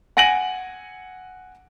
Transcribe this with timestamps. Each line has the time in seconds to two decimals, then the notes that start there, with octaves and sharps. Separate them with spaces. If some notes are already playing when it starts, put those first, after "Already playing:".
0.17 F#5 G#5 A#6 D7 D#7 F#7